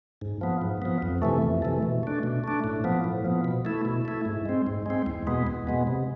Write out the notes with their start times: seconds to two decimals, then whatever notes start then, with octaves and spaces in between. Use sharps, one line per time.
0.21 G#2
0.41 F3 B3
0.61 G#2
0.82 F3 B3
1.02 F2
1.22 C3 E3 A3
1.42 F2
1.62 C3 E3 A3
1.82 B2
2.03 A3 D4
2.23 B2
2.44 A3 D4
2.64 A2
2.84 F3 B3
3.04 A2
3.24 F3 B3
3.44 B2
3.65 A3 E4
3.85 B2
4.05 A3 E4
4.25 G#2
4.45 G#3 C4
4.66 G#2
4.86 G#3 C4
5.06 E2
5.27 B2 G#3 B3
5.47 E2
5.67 B2 G#3 B3
5.87 C3